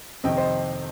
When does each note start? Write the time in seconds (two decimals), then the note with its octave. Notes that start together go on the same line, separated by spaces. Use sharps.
0.24 F2 C3 D#3 D#5 G5
0.37 C5 D#5